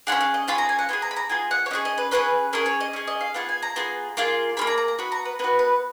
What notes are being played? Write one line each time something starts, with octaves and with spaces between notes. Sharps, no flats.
F4 G#4 F#5
C#4
F5
D#5
C#4 F4 G#4 B5
A#5
G#5
F#5
B3 F4 G#4 G#5
A#5
B5
A#5
B3 F4 G#4 G#5
F#5
C#5
C#4 F4 G#4 D#5
D#5
B4
C#4 F4 G#4 B4
C#4 G#4 A#4
C#5
D#5
C#4 G#4
D#5
F5
B3 F4 G#4 F#5
G#5
A#5
B3 F4 G#4
A#3 F4 G#4
A#3 F4 G#4 B5
A#5
A#5
A#5
B3 F#4 B5
A#5
B4
B3 F#4 B4
B4